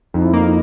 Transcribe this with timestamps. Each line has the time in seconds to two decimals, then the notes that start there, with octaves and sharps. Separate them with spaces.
0.14 F2 D#4
0.24 E4
0.34 A#3 D#4